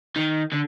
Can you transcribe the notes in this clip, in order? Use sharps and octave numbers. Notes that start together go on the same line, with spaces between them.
D#3
D3